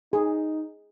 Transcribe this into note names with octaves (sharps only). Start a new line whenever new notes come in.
D#4 G#4